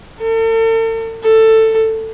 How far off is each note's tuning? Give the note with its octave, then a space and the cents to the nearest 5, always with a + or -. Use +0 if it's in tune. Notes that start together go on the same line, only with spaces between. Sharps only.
A4 +45
A4 +15